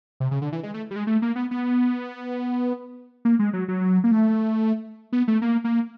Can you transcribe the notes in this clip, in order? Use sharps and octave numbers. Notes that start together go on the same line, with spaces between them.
C3
C#3
D3
E3
G#3
A3
G3
G#3
A3
A#3
B3
B3
A#3
G#3
F#3
F#3
A#3
A3
B3
A3
A#3
A#3